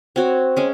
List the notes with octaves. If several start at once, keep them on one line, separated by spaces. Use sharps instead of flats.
C4 F#4 C#5
G#3 C#4